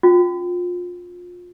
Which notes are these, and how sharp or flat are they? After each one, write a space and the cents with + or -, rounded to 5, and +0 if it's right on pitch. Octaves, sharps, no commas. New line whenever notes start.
C#4 +0 F4 +25